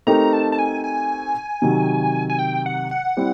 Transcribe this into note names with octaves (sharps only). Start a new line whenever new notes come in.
A3 C4 D#4 G4 A#4 A#5
A5
A5
G#5
G#5
C3 D#3 F#3
G#5
G5
F#5
F#5
G3 C4 E4